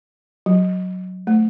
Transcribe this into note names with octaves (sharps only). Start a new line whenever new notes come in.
F#3
A3